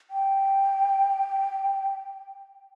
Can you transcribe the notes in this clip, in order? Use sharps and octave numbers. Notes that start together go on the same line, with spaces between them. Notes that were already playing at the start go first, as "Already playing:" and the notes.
G5